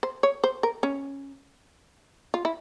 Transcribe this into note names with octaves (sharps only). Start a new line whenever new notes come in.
C5
C#5
C5
A#4
C#4
F4
E4